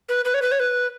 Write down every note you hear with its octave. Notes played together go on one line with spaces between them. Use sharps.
B4
B4
C#5
B4
C#5
B4